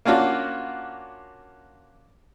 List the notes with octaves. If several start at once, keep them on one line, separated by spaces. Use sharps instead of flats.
A#3 C#4 D4 F4 F#4